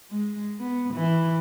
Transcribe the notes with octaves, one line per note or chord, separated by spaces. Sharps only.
G#3
B3
E3